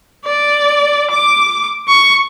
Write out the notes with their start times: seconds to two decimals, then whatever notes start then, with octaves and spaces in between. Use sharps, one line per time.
0.25 D5
1.11 D6
1.88 C#6